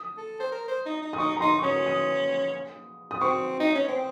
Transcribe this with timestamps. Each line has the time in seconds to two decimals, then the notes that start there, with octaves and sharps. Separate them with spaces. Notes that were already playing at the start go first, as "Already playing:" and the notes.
Already playing: D#6
0.17 A4
0.40 C5
0.52 A#4
0.68 C5
0.86 D#4
1.02 D#4
1.13 D#6
1.18 D#4 C#6
1.37 A#5
1.41 D#4 C6
1.59 C#6
1.63 C#4 D#6
1.86 D#6
3.11 D#6
3.21 C4 C#6
3.60 D#4
3.75 C#4
3.88 C4